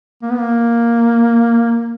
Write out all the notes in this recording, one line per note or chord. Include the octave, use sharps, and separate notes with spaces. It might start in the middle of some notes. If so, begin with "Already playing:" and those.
A#3
B3
A#3